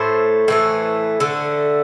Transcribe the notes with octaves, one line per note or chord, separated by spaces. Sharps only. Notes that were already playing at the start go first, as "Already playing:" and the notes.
Already playing: A2 A3 C5
A2 E3 A3
D3 A3